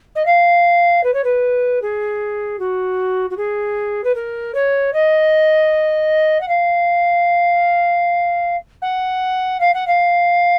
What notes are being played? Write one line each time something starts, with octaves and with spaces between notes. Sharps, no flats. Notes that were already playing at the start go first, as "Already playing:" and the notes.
D#5
F5
B4
C#5
B4
G#4
F#4
F#4
G#4
B4
A#4
C#5
D#5
F#5
F5
F#5
F5
F#5
F5